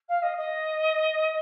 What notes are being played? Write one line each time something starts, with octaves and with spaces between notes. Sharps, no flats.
F5
D#5
D#5